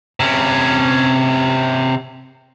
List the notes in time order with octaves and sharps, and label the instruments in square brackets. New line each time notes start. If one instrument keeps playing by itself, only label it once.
[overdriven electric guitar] C3 C#4